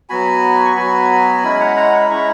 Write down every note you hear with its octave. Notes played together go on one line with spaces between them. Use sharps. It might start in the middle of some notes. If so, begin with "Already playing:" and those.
F#3 B3 F#4 G#5 B5
C#6
F#3 B3 F#4 G#5 B5
G#3 C#4 E4 G#5 B5
F#5 A#5
F#5 A#5
B5
G#3 C#4 E4 A#5 C#6